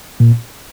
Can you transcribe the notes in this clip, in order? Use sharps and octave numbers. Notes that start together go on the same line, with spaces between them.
A#2